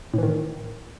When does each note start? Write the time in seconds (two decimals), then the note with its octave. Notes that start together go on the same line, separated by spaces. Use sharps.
0.14 A2
0.18 E3
0.23 D#3